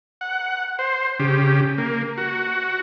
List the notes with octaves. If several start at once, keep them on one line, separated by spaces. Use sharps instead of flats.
F#5
C5
C#3 G4
A#3
F#4